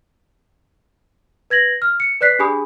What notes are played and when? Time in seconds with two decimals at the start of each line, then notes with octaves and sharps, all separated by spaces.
1.50 B4 G#6 A#6 F#7
1.82 F6
2.00 C#7
2.21 B4 D5 F#6 B6 C7
2.39 D4 G4 G#4 G#5 B5 D#6